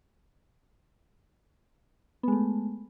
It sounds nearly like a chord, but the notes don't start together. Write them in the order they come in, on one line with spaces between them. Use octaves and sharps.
B3 G#3 A3